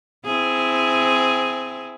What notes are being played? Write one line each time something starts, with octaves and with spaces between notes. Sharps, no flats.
C4 E4 G#4